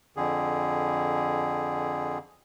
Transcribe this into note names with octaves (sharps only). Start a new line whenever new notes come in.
F2 D3 G#4